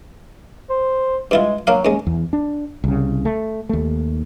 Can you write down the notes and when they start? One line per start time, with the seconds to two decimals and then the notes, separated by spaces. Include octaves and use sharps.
0.69 C5
1.31 G2 G#3 E4 F4
1.67 F#3 A#3 D4 F5
1.85 D#2 G#3 C#4
2.07 E2
2.33 D4
2.84 C2 C#3
3.25 A3
3.69 D#2 A3